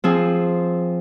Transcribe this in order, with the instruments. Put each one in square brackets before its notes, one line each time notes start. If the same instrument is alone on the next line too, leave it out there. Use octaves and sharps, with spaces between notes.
[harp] F3 C4 G#4